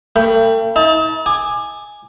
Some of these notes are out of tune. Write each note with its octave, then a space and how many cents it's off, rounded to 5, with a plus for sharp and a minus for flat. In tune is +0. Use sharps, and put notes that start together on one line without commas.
A3 +40 G5 +0 B5 +0
D#4 +45 A5 +0
G#5 +0 D6 +30